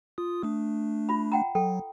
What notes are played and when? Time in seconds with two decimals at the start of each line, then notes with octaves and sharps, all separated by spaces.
0.18 F4 D#6
0.43 A3 D4 D#6
1.09 F4 B5
1.32 F#5 G5 A#5
1.55 F#3 A4 G5